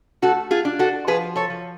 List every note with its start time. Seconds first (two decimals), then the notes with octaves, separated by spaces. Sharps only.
0.22 A3 F#4 A4
0.51 F4 G#4
0.65 D4
0.79 F#4 A4
1.07 F3 G#4 B4
1.36 A4 C#5
1.50 F3